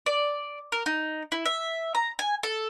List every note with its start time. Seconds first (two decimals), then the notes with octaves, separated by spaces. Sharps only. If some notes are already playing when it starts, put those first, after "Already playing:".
0.06 D5
0.72 A#4
0.86 D#4
1.32 E4
1.46 E5
1.95 A#5
2.19 G#5
2.43 A4